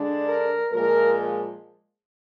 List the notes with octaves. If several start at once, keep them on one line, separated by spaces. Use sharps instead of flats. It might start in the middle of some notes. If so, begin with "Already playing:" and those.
Already playing: D3 G#3 D4
A#4
A#2 F3 G#3 A#4